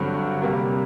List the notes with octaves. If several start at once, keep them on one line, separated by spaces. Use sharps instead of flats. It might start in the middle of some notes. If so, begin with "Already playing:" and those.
Already playing: G2 D3 F#3 C4 F#4
C3 G3 A#3